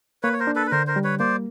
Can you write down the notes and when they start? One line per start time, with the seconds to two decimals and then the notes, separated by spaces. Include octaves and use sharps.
0.23 A#3 B4 C#5
0.33 C#5
0.40 A#4 C5
0.47 D4
0.56 A4 B4
0.67 B4
0.71 D3 A#4 C5
0.87 A#4 C5
0.96 G3
1.04 B4 C#5
1.19 A#3 C5 D5